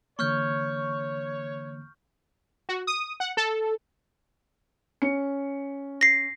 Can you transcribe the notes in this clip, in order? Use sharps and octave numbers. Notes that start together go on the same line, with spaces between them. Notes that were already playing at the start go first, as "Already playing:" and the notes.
D3 E3 A#3 C#5 C#6 F6 G6
F#4
D#6
F#5
A4
C#4 C#7
A#6 C7